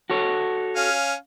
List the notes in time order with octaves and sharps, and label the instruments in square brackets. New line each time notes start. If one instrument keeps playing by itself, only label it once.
[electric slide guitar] F#4 A4 C#5
[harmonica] C#4 F5